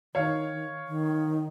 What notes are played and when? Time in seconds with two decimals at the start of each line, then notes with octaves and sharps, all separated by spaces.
0.15 D#3 C#5 F5
0.88 D#3